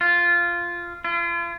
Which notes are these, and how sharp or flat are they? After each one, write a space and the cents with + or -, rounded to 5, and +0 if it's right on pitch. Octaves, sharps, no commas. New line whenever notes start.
F4 -10
F4 -40